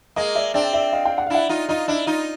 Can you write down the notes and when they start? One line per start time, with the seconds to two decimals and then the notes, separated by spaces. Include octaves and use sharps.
0.16 G#3 A#3 D#5
0.35 D5 E5
0.54 C4 D4 D5 E5
0.73 D5 E5
0.93 D#5 F5
1.05 F5 G5
1.18 F#5
1.26 F5
1.30 D4 E4 E5 F#5
1.49 D#4 F4
1.68 D#4 F4 D#5 F5
1.88 D4 E4 D#5
2.06 D#4 F4